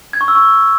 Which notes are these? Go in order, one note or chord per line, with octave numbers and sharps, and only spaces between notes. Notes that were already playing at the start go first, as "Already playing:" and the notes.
G#6
C#6
E6
C#6